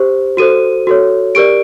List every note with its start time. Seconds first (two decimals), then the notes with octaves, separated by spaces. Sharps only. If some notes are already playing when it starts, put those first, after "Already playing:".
Already playing: G4 C5
0.37 F#4 A4 C5 D#7
0.87 F#4 A4 C#5
1.35 G4 A#4 D5 D7